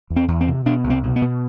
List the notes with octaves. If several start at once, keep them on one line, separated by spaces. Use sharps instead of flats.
E2
C4
E2
C4
C3
B2 D4
C2
C4
B2
B3
B2